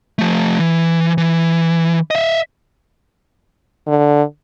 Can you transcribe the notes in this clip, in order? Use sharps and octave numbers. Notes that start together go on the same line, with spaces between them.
F3 A3
E3
E3
D#5 E5
D3